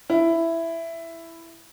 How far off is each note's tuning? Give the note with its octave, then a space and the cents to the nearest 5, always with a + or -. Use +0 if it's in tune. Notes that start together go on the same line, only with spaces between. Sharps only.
E4 +5